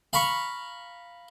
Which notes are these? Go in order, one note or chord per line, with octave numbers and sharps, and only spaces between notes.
F5 A#5 B5 C#6